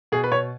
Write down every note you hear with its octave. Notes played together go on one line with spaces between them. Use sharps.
B2 G#4
B4
B2 C#5